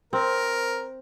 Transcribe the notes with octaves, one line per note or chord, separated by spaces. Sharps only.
C4 A#4